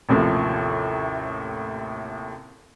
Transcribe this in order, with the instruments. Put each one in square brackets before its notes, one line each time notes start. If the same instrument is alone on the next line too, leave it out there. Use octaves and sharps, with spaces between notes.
[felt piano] A1 D#2 A2 C3 F3